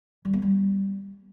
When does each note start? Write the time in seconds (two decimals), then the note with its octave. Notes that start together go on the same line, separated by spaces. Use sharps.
0.25 G3
0.33 B3
0.42 G3